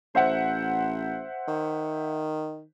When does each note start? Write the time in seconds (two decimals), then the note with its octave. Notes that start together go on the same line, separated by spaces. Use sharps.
0.15 A1 C5 E5 F#5
1.48 D#3